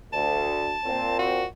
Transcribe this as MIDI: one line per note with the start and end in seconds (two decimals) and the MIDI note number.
0.13 0.74 38
0.13 1.16 81
0.85 1.44 46
0.85 1.44 60
1.19 1.45 66